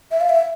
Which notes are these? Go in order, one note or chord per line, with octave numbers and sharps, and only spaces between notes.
E5
F5
E5